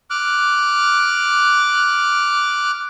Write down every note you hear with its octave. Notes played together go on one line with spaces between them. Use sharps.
D6 F6 F#6